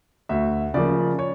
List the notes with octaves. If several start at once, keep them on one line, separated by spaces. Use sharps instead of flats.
D2 E5
C#3 F3 A#3 D5
C#5